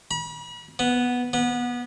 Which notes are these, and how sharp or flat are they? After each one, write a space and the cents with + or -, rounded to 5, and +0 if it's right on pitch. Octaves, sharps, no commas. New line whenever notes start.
B5 -40
B3 -5
B3 -20